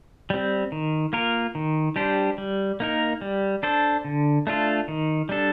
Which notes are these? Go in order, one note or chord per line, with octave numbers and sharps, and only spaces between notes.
G3 C4
D#3
A#3 F4 A#4
D#3
G3 D4 G4 C5
G3
A#3 D#4 A#4
G3
D4 A4 C5
D3
A3 D4 F4 A4
D#3
G3 D4 A4